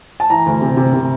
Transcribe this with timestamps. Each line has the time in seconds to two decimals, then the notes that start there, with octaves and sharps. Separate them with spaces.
0.20 A5
0.30 E3 A#5
0.46 D2
0.62 C3
0.77 C3
0.94 C3